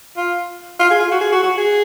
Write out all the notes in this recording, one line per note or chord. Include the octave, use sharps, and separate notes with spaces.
F4
F4
G#4
F4
F#4
G#4
F#4
F#4
G#4